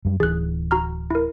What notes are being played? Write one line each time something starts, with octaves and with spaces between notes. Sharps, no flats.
F#2 G3
D1 E3 G#4 F#6
F#4 A#5 F6
E4 A#4